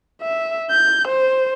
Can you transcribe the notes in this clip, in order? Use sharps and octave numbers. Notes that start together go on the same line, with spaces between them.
E5
G6
C5